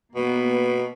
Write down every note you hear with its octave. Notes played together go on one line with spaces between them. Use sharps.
B2 A#3 B3